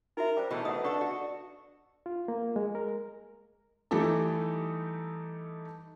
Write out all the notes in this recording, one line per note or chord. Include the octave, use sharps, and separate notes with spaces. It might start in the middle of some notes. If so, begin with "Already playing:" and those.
D#4 F#4 A#4 E5
G3 C5 D6
B2 E3 A3 D#4
B2 A3 F#5 D#6
D4 F#4 A4 C#6
F#4
F4
A#3
G#3
A#4
E3 G3 A3 D#4 G4 A4